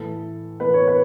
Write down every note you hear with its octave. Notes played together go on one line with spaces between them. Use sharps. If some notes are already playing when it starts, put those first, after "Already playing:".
Already playing: A2 E3 A4
A2 E3 B4
C#5
B4